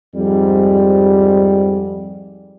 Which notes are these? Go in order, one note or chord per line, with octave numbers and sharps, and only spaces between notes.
F2 G#2 G3